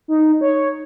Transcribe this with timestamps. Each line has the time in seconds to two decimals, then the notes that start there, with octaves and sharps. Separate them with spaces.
0.08 D#4
0.41 C#5